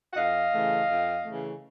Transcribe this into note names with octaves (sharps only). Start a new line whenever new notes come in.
F#5
F2 D#5 F5
C#3 E3 A3
F2
C#3 E3 A3